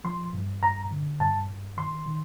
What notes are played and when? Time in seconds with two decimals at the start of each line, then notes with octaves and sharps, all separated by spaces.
0.04 F3 C6
0.33 G2
0.62 G2 A#5
0.91 D3
1.20 G2 A5
1.49 G2
1.77 D#3 C6
2.06 D#3